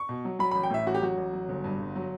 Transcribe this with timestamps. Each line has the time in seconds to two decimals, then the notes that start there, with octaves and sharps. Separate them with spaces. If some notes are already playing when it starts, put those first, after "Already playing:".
Already playing: C#6
0.09 B2
0.25 F#3
0.39 F#3 B5
0.51 A1 B5
0.63 G5
0.70 A2 E5
0.86 A1 F#4
0.94 G4
1.01 F#3 F#4
1.17 A1
1.33 F#3
1.49 G1
1.64 G2
1.79 G1
1.95 F#3